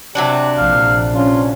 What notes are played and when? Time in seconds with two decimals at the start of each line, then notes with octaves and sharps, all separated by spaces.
0.15 C3 F#3 D4 G4
0.58 A#1 F5
1.15 C#4 F4